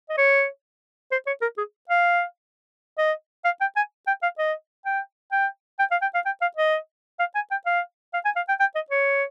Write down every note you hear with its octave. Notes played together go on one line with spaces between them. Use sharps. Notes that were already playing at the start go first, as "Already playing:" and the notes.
D#5
C#5
C5
C#5
A#4
G#4
F5
D#5
F5
G5
G#5
G5
F5
D#5
G5
G5
G5
F5
G5
F5
G5
F5
D#5
F5
G#5
G5
F5
F5
G#5
F5
G5
G5
D#5
C#5